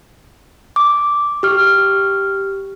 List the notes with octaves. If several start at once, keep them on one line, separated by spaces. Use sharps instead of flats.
D6
G4 F6